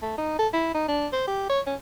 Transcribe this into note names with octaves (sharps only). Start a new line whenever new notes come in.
A3
D#4
A4
E4
D#4
D4
C5
G4
C#5
C#4